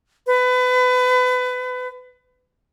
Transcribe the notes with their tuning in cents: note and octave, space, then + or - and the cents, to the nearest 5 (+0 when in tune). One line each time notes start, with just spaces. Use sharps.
B4 +30